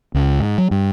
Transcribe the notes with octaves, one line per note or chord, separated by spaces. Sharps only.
C#2
G#2
F#3
G2